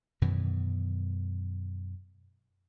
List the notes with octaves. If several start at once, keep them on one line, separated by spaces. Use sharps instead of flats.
F#2 B2 D#3 E3